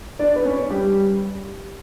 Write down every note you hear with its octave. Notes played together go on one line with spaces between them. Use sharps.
D4 D5
B4
C#4 C#5
G3 G4